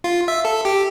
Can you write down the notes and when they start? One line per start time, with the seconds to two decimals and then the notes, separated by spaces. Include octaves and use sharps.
0.04 F4
0.28 E5
0.45 A4
0.65 G4